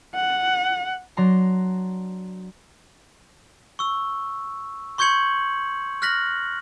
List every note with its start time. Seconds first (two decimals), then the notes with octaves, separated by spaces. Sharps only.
0.15 F#5
1.17 F#3 D4 A#5 C6
3.79 C#6 E6
4.98 C6 C#6 G6 G#6 C#7 F#7
6.02 F6 F#6 A#6 B6 F#7